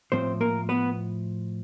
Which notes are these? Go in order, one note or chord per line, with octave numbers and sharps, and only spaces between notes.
A2 F3 C4 C5
A#3 A#4
B3 B4